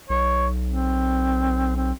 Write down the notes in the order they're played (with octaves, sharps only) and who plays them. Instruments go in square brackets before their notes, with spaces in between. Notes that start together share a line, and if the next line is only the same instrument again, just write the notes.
[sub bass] B1 [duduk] C#5
[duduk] C4
C4